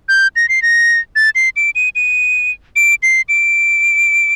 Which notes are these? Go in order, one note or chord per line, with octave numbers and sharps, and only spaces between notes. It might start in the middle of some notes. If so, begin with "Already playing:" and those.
G6
A#6
C7
A#6
A6
C7
D7
D#7
D#7
D7
C7
D7